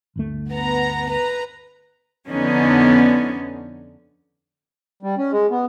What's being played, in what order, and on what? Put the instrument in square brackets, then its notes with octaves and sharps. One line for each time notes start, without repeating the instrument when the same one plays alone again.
[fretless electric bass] G1 D2 A3
[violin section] B3 A#5
B4 A#5
[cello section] F2 D3 B3 C#4 D#4
[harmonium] G3
C#4
G#3
B3